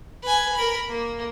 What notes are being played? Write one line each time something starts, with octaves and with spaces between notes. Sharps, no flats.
B4 G#5
A#4 B5
A#3